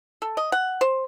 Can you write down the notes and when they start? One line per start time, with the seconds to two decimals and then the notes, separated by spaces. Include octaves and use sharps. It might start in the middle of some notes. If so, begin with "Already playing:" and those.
0.22 A4
0.37 D#5
0.52 F#5
0.81 C5